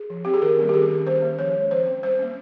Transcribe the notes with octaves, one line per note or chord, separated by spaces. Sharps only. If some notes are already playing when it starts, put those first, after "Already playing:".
Already playing: G#4
F3
C4 G4
G#4
D#3 A#4
G3 A#3 C#4
G4
D#3 G#4
A#3 C#4
D#3 C5
A#3 C#4
F3 C#5
G#3 C#4
F3 C5
C4
G3 C5
A#3 C#4